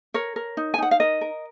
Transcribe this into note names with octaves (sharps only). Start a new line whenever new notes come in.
A#4 C#5
A#4
D#4
G#5
D#4 F#5
F5
A#4 D#5
A#4